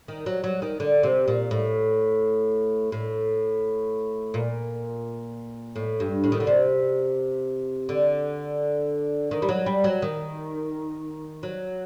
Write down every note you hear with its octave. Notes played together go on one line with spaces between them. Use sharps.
D#3
F#3
F#3
D#3
D3
C3
A#2
A2
A2
A#2
A2
G2
A2
D#3
D3
C3
D3
D#3
G3
F#3
G3
F#3
D#3
F#3